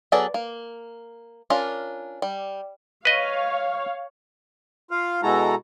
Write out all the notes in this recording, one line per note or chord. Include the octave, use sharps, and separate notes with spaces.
F#3 B3 G#4 A4 D5
A#3
C#4 D4 F4 A#4
G3
B4 C#5 D#5 F5
F4 F5
B2 G#3 E4 F#4 A4 A#5